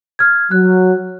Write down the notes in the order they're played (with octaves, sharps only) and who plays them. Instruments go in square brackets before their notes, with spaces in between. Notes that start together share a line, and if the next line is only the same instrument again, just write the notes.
[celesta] F6 G#6
[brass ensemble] F#3 [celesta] F#6